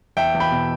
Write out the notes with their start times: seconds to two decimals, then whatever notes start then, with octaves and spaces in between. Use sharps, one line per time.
0.17 E2 E5 G5
0.34 E2
0.40 G5 B5
0.51 B2